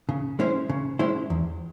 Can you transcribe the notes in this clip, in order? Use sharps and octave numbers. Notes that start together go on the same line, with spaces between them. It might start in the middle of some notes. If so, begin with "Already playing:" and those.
C#3
G#3 C#4 E4 C5
C#3
G#3 C#4 E4 C5
E2